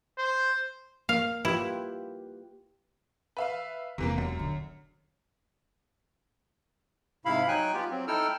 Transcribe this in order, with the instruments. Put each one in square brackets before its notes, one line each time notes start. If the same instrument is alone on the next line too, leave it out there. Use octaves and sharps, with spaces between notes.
[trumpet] C5
[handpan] A#3 [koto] F5
[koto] E4 [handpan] F4 G4 B4
[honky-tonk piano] B4 E5 F5
[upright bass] E1 [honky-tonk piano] C3 E3 A#3
[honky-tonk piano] F#2
[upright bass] D3
[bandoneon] G#2 C3 E4 F5 B5
F#3 D#4 G5 G#5 F#6
B3 F4 G4
F#3 C4
D#4 E4 A4 G5 E6 F6